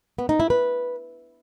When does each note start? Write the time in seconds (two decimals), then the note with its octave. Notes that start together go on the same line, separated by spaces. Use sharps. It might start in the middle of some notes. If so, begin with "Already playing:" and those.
0.18 B3
0.29 D#4
0.40 E4
0.50 B4